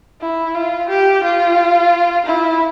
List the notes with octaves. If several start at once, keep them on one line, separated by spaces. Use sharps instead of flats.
E4
F4
G4
F4
E4